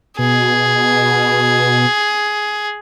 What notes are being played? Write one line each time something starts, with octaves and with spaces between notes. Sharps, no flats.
B2 G#4